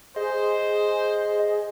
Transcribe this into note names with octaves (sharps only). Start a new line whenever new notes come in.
G#4 C5 D#5